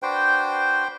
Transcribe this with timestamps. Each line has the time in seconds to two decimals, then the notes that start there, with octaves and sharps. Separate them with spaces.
0.03 D4 F#4 B4 C5 G5